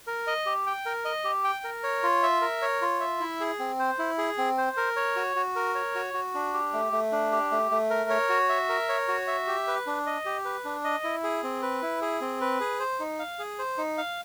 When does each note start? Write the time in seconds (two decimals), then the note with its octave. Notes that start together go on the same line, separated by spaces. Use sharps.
0.07 A#4
0.27 D#5
0.46 G4
0.66 G5
0.86 A#4
1.05 D#5
1.24 G4
1.44 G5
1.64 A#4
1.83 C#5
2.03 F4
2.23 E5
2.42 A#4
2.62 C#5
2.81 F4
3.00 E5
3.20 E4
3.40 G#4
3.59 C4
3.79 C5
3.99 E4
4.18 G#4
4.38 C4
4.58 C5
4.77 A#4
4.96 C#5
5.16 F#4
5.36 F#4
5.56 A#4
5.75 C#5
5.95 F#4
6.14 F#4
6.34 D4
6.54 G4
6.73 A3
6.92 A3
7.12 D4
7.32 G4
7.52 A3
7.71 A3
7.90 A#4
8.10 C#5
8.30 F#4
8.49 E5
8.69 A#4
8.89 C#5
9.08 F#4
9.27 E5
9.47 G4
9.67 B4
9.87 D4
10.06 D#5
10.26 G4
10.45 B4
10.65 D4
10.84 D#5
11.04 E4
11.24 G#4
11.43 C4
11.62 B4
11.82 E4
12.02 G#4
12.21 C4
12.41 B4
12.60 G#4
12.80 C5
13.00 D#4
13.19 F5
13.39 G#4
13.59 C5
13.78 D#4
13.98 F5